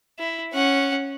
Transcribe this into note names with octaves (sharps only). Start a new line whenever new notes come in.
E4
C#4 F#5